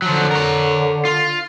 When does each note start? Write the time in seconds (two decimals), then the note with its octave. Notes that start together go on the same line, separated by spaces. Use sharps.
0.02 D3 F3 F#3
0.31 A#4 C#5
1.05 F4